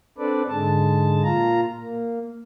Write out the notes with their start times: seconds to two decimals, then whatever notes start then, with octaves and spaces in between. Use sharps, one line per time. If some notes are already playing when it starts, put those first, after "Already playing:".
0.18 C4 D4 A4 B4 D5
0.48 G#2 D3 G#3 A5
1.23 A#2 F4 A#5
1.81 A#3